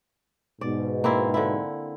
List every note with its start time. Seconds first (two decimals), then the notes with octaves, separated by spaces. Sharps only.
0.61 G#2 B2 D5
1.04 A#3 C4 E4
1.34 D3 E4